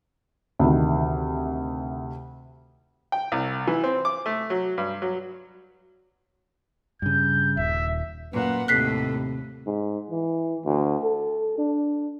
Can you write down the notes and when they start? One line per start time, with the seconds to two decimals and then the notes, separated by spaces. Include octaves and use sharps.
0.59 D2 C3 D#3
3.12 G5
3.32 C2
3.67 E3
3.84 C4
4.05 D6
4.26 A3
4.50 F#3
4.78 G2
5.02 F#3
7.02 G2 C#3 G6
7.57 D#1 E5
8.33 F#2 A#2 B4 F#5
8.68 D#2 A2 C3 A4 F#6 B6 C7
9.67 G#2
10.11 E3
10.66 D2
11.03 A4
11.58 D4